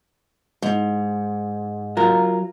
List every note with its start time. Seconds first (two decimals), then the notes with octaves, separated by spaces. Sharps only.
0.62 G#2
1.97 F#3 F4 A#4